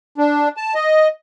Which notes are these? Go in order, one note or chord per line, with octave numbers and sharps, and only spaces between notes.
D4
A5
D#5